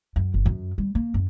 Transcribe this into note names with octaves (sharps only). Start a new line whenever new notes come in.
F#2
G1
F#2
G3
A#3
F#2